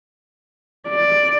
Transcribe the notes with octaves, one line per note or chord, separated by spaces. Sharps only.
D5